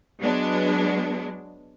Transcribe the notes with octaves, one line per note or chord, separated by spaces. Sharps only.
F#3 G#3 B3 D4